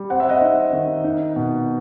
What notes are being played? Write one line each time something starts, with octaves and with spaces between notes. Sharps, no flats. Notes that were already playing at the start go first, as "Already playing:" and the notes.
Already playing: G3
C4 F#5
E5
D#5 F#5
D#4
D#3
D#4
B2